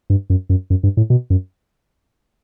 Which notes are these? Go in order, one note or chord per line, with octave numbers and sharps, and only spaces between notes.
G2
F#2
F#2
F#2
G2
A2
B2
F#2